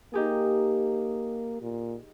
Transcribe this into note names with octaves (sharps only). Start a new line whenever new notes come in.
A#3 D#4 G4 G#4
A#2